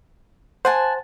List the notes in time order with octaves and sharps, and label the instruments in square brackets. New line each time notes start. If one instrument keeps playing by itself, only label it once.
[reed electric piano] C5 [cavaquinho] F#5 G#5 A5